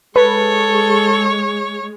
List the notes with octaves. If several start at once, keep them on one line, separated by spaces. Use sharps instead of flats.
G#3 A4 B4 C#5